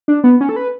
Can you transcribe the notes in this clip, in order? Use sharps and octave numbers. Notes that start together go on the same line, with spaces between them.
D4
B3
C#4
A4
B4